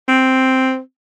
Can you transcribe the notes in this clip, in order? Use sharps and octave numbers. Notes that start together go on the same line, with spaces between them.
C4